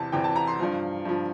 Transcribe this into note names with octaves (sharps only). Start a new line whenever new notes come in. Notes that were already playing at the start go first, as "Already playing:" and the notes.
Already playing: E2 C3 E3 A5
E2 C3 E3 G5
A5
A#5
C6
G2 F3
G2 F3